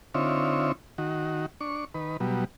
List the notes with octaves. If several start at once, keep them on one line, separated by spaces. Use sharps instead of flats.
D3 C4 D#4 F4 C#5 E5
D#3 F#4
D4 C#6
D#3 B4
B2 F#3 G3